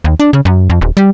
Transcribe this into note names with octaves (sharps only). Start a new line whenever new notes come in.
D#2
D4
C#3
F#2
F2
D#1
G3